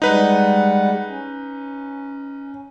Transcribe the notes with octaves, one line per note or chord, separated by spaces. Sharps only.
G3 G#3 D#4 B4 F#5
C#4